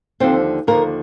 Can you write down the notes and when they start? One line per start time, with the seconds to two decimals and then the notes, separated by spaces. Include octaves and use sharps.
0.20 D#2 D3 F3 C4 C5
0.67 D#2 D3 F3 A#3 A#4